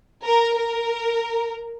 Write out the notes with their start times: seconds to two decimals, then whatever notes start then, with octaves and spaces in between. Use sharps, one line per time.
0.24 A#4
0.57 A#4